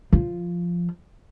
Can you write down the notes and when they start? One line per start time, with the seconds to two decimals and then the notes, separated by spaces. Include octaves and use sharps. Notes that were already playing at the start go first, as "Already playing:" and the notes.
0.13 F3